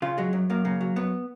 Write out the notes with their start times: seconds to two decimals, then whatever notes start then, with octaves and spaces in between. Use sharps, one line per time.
0.02 C#3 F4
0.18 F#3 G#3
0.33 F#2
0.50 F#2 A#3
0.65 C#3 A#3
0.81 F#3
0.96 F#2 B3